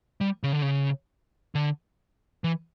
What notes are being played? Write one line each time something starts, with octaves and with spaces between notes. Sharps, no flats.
G3
C#3
D3
C#3
D3
E3